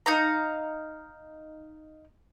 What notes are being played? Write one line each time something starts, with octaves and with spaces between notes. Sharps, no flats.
D#4 F5 A#5